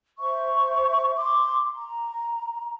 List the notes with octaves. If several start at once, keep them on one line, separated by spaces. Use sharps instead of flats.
C5 E5 C#6
C6 D6
A#5